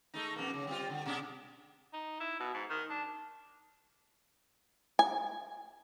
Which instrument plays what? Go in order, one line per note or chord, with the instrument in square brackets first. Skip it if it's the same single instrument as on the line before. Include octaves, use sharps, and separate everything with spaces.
[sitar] G#3 A3 D#4
F2 B2 A#3
C#3
G3 C4 F4
D3
B2 G#3 D4
[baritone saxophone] D#4
E4
B2
G#2
D#3
D4
[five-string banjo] G#5